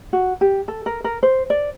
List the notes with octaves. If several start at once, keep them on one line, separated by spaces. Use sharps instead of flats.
F#4
G4
A4
A#4
A#4
C5
D5